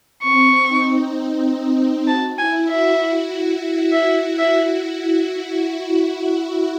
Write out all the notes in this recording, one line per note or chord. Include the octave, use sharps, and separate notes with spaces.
C4 C#6
D#4
F#4 A5
E4 G#5
F#4 E5
F#4
E5
E5